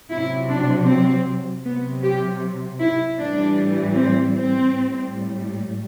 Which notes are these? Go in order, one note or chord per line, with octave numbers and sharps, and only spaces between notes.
C3 F#3 E4
D4
C4
C3 F#3 B3
G4
E4
A2 E3 G3 D4
C4
C4
A2 G3